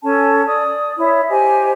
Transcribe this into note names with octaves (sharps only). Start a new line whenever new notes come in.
C#4 A4 G#5 A5
D5 D#6
E4 C#5 E5
G4 C5 D#5 G#5